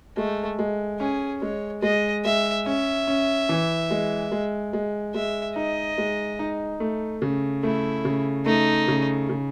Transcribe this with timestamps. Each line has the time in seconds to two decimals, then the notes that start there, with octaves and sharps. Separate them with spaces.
0.17 G#3 A3
0.59 G#3
1.00 C#4 G#4
1.42 G#3 C#5
1.82 G#3 D#5
2.24 G#3 E5
2.66 C#4 E5
3.07 C#4
3.49 E3
3.91 G#3
4.32 G#3
4.73 G#3
5.14 G#3 E5
5.56 D#4 D#5
5.98 G#3
6.39 D#4
6.80 A3
7.22 C#3
7.63 A3 E4
8.05 C#3
8.46 A3 D#4
8.88 C#3
9.29 C#3